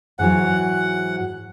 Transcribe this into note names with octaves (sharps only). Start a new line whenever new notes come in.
G#2 E3 F#3 F#5